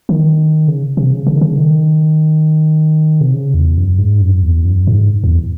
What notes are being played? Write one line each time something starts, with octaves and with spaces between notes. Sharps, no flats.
D#3
C#3
C3
C#3
C#3
D#3
C#3
D#3
C3
C#3
E2
F#2
G#2
F#2
E2
F#2
G#2
E2